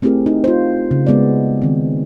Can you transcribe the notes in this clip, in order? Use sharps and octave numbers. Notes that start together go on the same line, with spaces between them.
A3 C4 E4 G4 G#4 A#4
D#4
F4 C5
C#3
G#3 B3 F#4 D5
D#3 C4